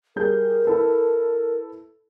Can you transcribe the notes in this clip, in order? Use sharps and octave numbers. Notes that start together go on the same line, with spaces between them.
G3 G#4 A#4 G6
E4 A4 B4